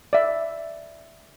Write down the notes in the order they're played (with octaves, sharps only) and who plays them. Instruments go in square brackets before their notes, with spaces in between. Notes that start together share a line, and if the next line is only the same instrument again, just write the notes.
[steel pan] D5 E5